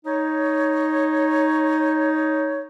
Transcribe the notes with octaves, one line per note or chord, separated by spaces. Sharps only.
D#4 C#5